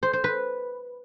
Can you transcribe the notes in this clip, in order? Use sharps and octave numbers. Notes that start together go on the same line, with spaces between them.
C5
C5
B4